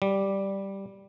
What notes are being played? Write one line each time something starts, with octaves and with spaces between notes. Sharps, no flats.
G3